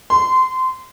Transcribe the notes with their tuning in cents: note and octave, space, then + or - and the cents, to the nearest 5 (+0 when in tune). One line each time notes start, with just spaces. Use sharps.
C6 -20